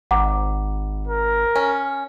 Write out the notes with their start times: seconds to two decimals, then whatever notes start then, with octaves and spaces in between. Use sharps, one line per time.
0.11 G#1 F#5 A#5 D6
1.07 A#4
1.56 C#4